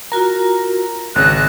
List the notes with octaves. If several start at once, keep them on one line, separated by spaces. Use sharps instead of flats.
F4 F#4 A#4 A#5
G#1 C#3 C#5 F#6 A#6